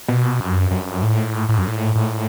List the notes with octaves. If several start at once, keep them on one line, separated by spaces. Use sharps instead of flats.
B2
F#2
F#2
A2
A2
F#2
A2
A2